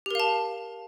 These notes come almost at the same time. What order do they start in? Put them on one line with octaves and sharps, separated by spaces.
G4 A#4 F5 A5